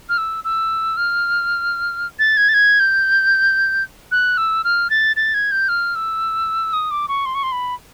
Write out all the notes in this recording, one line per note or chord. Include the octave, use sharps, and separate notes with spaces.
F6
E6
E6
F6
A6
G#6
A6
G#6
G6
F#6
E6
F6
A6
A6
G#6
G6
F6
E6
D#6
D6
C#6
C6
C#6
C6
B5